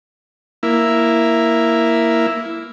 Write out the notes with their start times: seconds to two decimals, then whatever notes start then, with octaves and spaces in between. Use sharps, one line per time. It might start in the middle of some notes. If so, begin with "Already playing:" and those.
0.63 A#3 E4